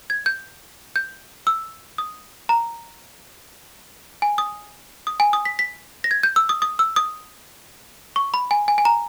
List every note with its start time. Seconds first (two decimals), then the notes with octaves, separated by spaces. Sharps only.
0.10 G#6
0.26 G6
0.96 G6
1.47 E6
1.98 D#6
2.49 A#5
4.22 G#5
4.38 D#6
5.07 D#6
5.20 G#5
5.33 D#6
5.45 B6
5.59 B6
6.04 A#6
6.11 G#6
6.23 G6
6.36 E6
6.49 D#6
6.62 D#6
6.79 E6
6.96 D#6
8.16 C#6
8.34 B5
8.51 G#5
8.68 G#5
8.78 G#5
8.85 A#5